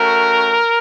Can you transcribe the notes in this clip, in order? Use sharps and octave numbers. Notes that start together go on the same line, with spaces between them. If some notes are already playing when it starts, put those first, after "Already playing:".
Already playing: A3 C#4 F#4 A#4